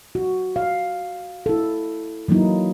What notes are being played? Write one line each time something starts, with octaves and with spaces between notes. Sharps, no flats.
F#4
F5
E4 A4
E3 F#3 A#3 D#4 E4